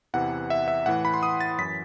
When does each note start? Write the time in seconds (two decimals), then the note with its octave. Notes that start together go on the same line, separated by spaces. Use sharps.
0.14 E2 C3 E3 F#5
0.50 E5
0.68 E5
0.86 A2 E3 F#5
1.05 B5
1.14 C6
1.23 D#6
1.41 A6
1.58 F#2 E3 B6